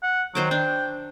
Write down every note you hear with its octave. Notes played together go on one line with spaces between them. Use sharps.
F#5
D#3 F#3 C5 D6
D4 G5